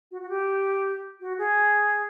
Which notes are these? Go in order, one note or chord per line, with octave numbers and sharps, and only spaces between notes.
F#4
F#4
G4
F#4
G#4